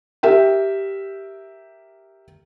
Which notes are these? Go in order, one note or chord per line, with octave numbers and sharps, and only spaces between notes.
G4 A#4 E5 G5